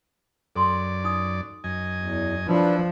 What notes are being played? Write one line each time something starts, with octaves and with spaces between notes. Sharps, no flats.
F#2 A4 D5 C6
D#4 D#6
F#2 D#5 G#5
E2
F3 D4 E4 B4